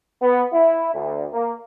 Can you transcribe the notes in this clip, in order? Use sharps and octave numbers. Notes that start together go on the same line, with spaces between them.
B3
E4
D2
A#3